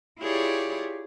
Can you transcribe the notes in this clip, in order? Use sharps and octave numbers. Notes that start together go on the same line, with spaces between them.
E4 F4 G4 G#4 C#5 D5